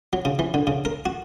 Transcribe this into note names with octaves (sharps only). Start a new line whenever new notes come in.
F#3
C#3
E3
D3
C#3
A#4
F#4